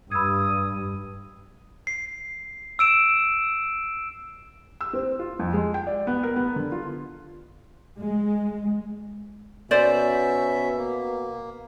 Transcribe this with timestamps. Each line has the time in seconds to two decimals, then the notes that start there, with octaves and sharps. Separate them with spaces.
0.11 G2 B5 D#6 E6 G#6
1.87 C7
2.79 E6 D7 E7
4.81 E6
4.93 C4
5.19 F4
5.39 F2
5.53 G#3
5.74 G5
5.87 D5
6.07 B3
6.23 A#4
6.36 B3
6.56 D3
6.72 F4
7.99 G#3
9.71 B2 C#4 C5 D5 E5
10.77 A#3